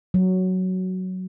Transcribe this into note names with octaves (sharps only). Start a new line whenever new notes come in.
F#3